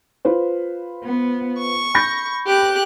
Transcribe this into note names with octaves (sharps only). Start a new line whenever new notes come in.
F4 B4 C5
B3
C#6
B5 G6 A#6
G4 F#6